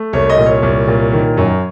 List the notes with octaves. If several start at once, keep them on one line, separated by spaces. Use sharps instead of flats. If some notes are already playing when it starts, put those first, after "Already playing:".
Already playing: A3
C2 C#5
D#5
A#2
C#5
C2
A#2
D#3
F#2